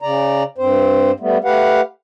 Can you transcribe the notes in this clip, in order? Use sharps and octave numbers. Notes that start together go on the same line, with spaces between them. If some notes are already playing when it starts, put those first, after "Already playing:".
C#3 D5 A#5
G2 C4 C5
G3 A3 B3
A3 G4 B4 F5 F#5